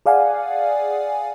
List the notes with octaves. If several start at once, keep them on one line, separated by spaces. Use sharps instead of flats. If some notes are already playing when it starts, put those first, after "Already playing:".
G#4 D5 F5 F#5 G#5